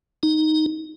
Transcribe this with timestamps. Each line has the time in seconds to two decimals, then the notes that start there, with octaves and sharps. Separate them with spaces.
0.23 D#4